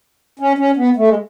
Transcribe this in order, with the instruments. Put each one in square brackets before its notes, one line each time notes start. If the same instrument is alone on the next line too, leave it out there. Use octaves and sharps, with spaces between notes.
[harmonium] C#4
C#4
B3
A3
G#3